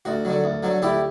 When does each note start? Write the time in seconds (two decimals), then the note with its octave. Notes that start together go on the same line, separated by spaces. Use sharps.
0.05 D2 F#4
0.25 D3 F#3
0.44 D2
0.63 D3 F#3
0.82 D2 E4 G4